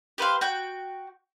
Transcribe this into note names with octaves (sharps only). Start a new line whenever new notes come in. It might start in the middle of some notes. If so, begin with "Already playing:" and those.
G4 B4 C5 F5
F#4 G5